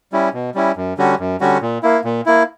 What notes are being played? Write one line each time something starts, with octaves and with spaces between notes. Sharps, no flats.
G3 C#4 E4
B2
G3 C#4 E4
F#2
D3 G3 C#4 F#4
F#2
D3 G3 C#4 F#4
A#2
A#3 E4
A#2
A#3 E4